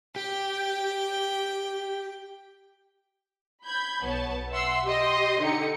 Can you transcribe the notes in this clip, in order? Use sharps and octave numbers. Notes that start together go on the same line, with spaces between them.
G4 G5
B5 G6 G#6
B1 B3 C#5 A5
E5 F#5 C6 E6
G4 D#5 C6
D3 D#4 G4 C#7